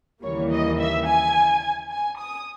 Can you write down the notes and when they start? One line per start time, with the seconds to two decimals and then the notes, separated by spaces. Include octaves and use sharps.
0.23 D#2 C#3 E3 G3 A#3 C#5
0.51 D#5
0.79 E5
1.07 G#5
1.91 G#5
2.19 D#6